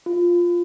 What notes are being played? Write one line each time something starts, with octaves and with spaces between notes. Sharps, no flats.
F4